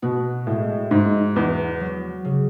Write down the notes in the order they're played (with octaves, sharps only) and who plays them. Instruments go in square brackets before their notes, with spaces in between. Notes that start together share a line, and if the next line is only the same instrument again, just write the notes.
[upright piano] B2 [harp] F#4
[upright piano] A2 [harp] G#3
[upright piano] G#2 [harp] G#3
[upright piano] E2 [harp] F#4
[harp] F#3
C#3